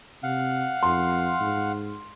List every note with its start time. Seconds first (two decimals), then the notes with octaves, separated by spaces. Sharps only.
0.23 C3 F5 F#5
0.83 F2 C6
1.40 G#2